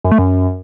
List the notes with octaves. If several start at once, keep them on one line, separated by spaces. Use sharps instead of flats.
F#2
A3
F#2